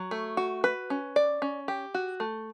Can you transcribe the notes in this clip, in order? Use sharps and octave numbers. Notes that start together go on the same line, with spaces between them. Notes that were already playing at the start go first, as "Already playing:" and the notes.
Already playing: F#3
A3
F#4
B4
C#4
D5
C#4
G4
F#4
A3